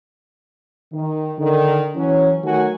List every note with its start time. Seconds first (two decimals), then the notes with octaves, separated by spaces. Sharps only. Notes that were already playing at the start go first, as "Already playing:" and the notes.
0.93 D#3
1.39 D3 D#3
1.96 E3 F#3 C#4
2.44 D#3 F#3 A3 F#4 G#5